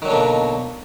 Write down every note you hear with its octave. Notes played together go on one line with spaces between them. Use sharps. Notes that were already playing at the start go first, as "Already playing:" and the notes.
B2 D3 D#3 F#3 A#3